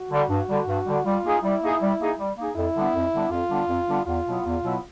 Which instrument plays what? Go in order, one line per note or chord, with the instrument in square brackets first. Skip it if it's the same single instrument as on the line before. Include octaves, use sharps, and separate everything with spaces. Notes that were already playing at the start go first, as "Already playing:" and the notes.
Already playing: [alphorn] F#4
[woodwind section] D3 G3
G2
D3 G3
G2
D3 G3
[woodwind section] G3 [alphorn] F4
[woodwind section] A#3 D#4 G#4
[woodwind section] G3 [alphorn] E4
[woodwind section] A#3 D#4 G#4
G3
A#3 D#4 G#4
G3
A#3 D#4 G#4
[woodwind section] F2 [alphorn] E4
[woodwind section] D3 G3 B3 D4
F2
D3 G3 B3 D4
[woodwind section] F2 [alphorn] F4
[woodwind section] D3 G3 B3 D4
F2
D3 G3 B3 D4
[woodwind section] E2 [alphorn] F4
[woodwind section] B2 F#3 B3 E4
E2
B2 F#3 B3 E4